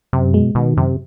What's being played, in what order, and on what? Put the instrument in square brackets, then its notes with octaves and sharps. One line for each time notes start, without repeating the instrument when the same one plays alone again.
[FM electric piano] F#2 [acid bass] C3
[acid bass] B2 [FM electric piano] G#3
[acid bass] B2 [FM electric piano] D#3
[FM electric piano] F#2 [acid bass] C3